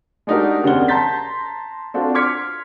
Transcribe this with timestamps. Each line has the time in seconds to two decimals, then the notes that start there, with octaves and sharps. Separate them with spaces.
0.27 G#3 D4 D#4 F#4 G4 A#4
0.63 D#2 C#3 C4 D5 F#5 G7
0.88 A5 A#5 C6 G6 A6 B6
1.94 C4 D4 F4 F#4 A4
2.14 C6 D6 F6 G#6 B6 C#7